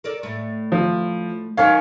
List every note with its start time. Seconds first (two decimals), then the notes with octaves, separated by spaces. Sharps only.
0.04 A4 A#4 D5
0.23 A2 A3
0.72 F3
1.57 D#3 F#3 C#4 C5 C#5 F5